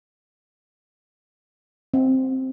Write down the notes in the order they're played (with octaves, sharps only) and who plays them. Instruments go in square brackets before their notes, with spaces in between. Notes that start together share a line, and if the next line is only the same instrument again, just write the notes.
[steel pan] C4